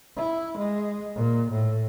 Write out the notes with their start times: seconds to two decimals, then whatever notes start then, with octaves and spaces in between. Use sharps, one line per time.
0.16 E4
0.58 G#3
1.15 A#2
1.51 A2